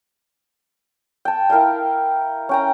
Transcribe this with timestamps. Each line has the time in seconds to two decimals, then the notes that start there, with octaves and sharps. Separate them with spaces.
1.25 G5 A5
1.50 E4 A#4 F5 G5
2.49 C#4 G5 A#5